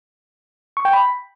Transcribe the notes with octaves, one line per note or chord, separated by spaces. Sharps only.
C#6
G5
B5